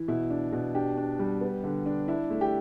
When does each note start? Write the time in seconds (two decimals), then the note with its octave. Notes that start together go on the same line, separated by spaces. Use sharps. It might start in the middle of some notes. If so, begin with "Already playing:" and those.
Already playing: E3
0.08 B2 E4
0.30 D4
0.52 B2
0.75 D4 G4
0.98 D4
1.19 G3
1.41 B3
1.64 D3
1.86 D4
2.08 D4 E4
2.30 A3
2.41 G4